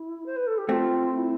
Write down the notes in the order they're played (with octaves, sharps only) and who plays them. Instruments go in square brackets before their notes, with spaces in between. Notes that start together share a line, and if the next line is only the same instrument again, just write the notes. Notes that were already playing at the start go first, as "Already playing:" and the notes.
Already playing: [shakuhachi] E4
C5
B4
A4
G4
[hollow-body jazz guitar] A3 C4 [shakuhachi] F4 G4
[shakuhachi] E4